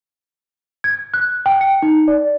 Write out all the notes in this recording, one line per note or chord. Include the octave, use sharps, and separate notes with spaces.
G#6
F#6
G5
C#7
D#4
D5